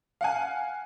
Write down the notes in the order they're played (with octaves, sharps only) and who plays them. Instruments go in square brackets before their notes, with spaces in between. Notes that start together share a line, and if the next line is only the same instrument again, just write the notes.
[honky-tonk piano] F5 F#5 G#5